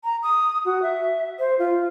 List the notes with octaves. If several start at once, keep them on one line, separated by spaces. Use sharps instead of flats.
A#5
D#6
F#4
E5
C5
F4